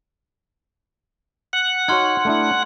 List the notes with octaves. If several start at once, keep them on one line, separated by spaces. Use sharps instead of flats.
F#5
D#4 F#4 C#5 C6 F6 G#6
A3 D4 E4